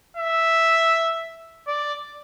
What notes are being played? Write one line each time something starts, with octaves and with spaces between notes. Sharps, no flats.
E5
D5